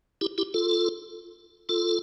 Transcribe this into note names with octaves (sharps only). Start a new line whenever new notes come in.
E4 G4
E4 G4
F4 A4
F4 A4